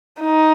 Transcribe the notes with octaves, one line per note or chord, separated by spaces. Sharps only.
D#4